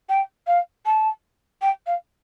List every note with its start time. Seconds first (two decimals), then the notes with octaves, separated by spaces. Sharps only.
0.09 G5
0.47 F5
0.86 A5
1.62 G5
1.86 F5